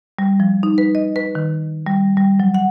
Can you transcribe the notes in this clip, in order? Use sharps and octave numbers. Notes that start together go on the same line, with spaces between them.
G3
F3
D#4
B4
D#5
B4
D#3
G3
G3
F#3
F#5